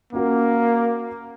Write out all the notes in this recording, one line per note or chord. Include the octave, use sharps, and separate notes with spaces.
A#3 C#4 F#4 A#4